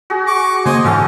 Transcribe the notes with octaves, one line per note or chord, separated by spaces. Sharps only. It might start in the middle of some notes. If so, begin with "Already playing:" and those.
F#4 G#4
C#6 D6
C#3 A#3 D#4 C5 G#5 C6 D#6
G#2 E3 C#4 F4 F#4 A4